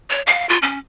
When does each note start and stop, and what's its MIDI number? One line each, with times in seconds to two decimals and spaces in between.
0.10 0.21 73
0.27 0.48 77
0.49 0.58 65
0.62 0.78 61